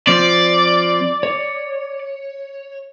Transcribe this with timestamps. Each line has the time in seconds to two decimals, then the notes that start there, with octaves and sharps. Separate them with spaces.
0.07 F3 C4 D5
1.23 C#5